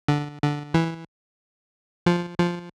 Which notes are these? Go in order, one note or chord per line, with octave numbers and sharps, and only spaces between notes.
D3
D3
E3
F3
F3